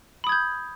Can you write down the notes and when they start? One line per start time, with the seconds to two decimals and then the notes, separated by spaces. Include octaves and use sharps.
0.24 B5
0.27 D#6
0.29 G#6
0.32 G6